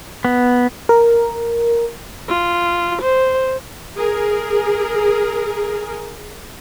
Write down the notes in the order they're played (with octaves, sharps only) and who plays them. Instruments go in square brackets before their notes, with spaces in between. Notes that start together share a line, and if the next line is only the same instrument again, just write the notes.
[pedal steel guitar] B3
[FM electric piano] A#4
[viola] F4
C5
[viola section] G#4 A#4